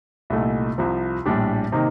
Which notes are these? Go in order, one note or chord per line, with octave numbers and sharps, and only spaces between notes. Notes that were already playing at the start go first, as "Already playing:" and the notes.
C2 A#2 A3 D#4
C2 C3 F3
A#1 A2 G3 D4 G4
C3 D#3 A#3 D#4